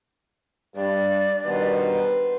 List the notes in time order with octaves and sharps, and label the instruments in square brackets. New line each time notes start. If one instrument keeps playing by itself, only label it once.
[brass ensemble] G2 [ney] D5
[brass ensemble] G2 B2 D#3 [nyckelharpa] B4 C5